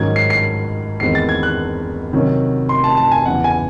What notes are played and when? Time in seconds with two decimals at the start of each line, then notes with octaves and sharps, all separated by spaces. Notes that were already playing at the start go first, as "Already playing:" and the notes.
Already playing: G#2 D#3 F#3 C#4 G#6
0.16 C7
0.30 C7
1.00 E2 D#3 G#3 C4 C7
1.15 A6
1.29 G#6
1.43 F#6
2.13 C3 D#3 F#3 C#4
2.69 C6
2.84 A5
2.97 A5
3.12 G#5
3.26 E2 C#3 E3 F#5
3.44 G#5